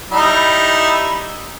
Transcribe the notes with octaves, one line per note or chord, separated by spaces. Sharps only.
G3 D#4 E4